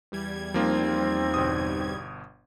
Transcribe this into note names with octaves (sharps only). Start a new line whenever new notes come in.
E2 G3 G#6
F3 A#3 C4 D#4 F4
G1 B2 D#6